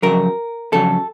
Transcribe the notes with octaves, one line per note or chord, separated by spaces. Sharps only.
F2 C#3 F#3 A#4
F2 C#3 F#3 A4